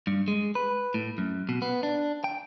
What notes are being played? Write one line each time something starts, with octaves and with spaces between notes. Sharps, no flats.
G2
G#3
B4
A2
F#2
B2
B3
D4
G5